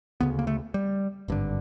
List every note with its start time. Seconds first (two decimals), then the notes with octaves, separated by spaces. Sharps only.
0.21 D2 C#3 B3
0.39 A#3
0.47 A3
0.74 G3
1.28 G#1 G2 D3